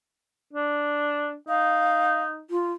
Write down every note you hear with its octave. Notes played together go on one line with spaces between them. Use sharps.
D4
D#4 F5
F4